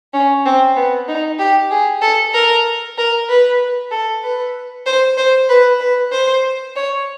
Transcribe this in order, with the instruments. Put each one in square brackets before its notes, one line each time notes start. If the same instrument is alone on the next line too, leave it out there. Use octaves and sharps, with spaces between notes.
[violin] C#4
C4
B3
D#4
G4
G#4
A4
A#4
A#4
B4
A4
B4
C5
C5
B4
B4
C5
C#5